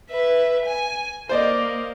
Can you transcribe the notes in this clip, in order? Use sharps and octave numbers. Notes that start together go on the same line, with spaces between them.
B4 E5
G#5
A#3 C5 D5 D#5